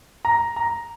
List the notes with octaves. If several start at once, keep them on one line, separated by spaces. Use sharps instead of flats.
A#5
A#5